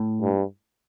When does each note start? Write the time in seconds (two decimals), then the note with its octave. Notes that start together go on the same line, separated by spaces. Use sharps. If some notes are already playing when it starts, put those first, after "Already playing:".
Already playing: A2
0.22 G2